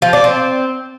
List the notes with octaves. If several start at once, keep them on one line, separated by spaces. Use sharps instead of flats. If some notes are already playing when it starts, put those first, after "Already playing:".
F3
D4
C4